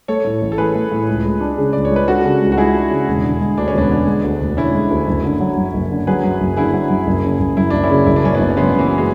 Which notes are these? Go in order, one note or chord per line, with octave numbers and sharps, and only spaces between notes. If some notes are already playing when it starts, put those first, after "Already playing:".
A3 A4 C#5
A2
A1
A4
E3 G#4 B4
A3
A2
C#2
G#3
D4
C#3
C#2 D5
C#5
G#3 B4
D4 F#4 A4
C#3
C#2
F#4
G#3 E4 G#4
D4
C#3
E1
D3
G#3
D2 D4
C#4
E1 B3 D4
D3
G#3
D2
E1
D3 C#4 E4
G#3
D2
F#1
D3
F#3
F#2
F#1
D3
F#3 G#4 B4
F#2
F#1
D3 E4 G#4
F#3
F#2
F#1
C#3
F#1
F#2 E4
F#1 D4
C#4 E4
C#3
F#1 E4
D4
F#2 C#4
F#1 B3 D4
C#4
C#3 G#3 B3
F#1
E3
F#3
G#3